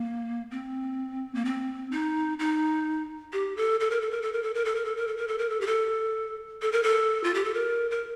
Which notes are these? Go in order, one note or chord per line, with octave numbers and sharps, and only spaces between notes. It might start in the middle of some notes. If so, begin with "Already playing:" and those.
Already playing: A#3
C4
A#3
C4
D#4
D#4
G4
A4
A4
A#4
A4
A#4
A4
A#4
A4
A#4
A4
A#4
A4
A#4
A4
A#4
A4
A#4
A4
G4
A4
A4
A#4
A4
F4
G4
A4
A#4
A#4